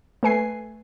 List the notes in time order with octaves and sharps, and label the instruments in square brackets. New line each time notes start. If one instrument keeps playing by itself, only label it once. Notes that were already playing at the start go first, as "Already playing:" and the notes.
[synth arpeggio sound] A3 B4 G#5 C7